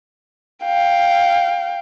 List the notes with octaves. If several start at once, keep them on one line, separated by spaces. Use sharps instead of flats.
F5 G5